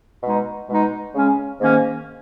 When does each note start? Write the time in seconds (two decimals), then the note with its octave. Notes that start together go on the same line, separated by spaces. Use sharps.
0.23 B2 G#3 D#4
0.68 B2 G#3 D#4
1.14 C#3 G#3 C#4
1.59 G#2 D#3 A#3 C#4